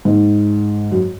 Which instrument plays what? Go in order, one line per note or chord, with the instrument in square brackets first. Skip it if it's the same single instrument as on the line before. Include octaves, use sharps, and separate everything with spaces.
[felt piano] G#2
F#2